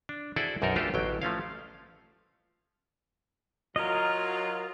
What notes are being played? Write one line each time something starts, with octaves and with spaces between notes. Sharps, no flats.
D4
E4 F#4 G#4 A4 C5 D5
B1 F#2 D#4 A4 A#4 F#5
A3 D4 F4 G4 A4 C5
A1 D3 F#3 G5
F3 A3 C#4 F5
F#3 F4 A#4 D#5